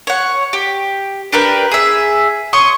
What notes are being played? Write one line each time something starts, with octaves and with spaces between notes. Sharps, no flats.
C#5 F#5
G4
D4 G4 A#4 B4
G#4 E5
C#5 C6 C#6 D#6